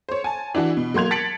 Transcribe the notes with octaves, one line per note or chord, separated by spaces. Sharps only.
C5 C#5
G#5 A5
E3 D4 E4 F#4
B2
F#3 A#3 C6 G#6 F7
A5 A6 B6 C#7 D7 F#7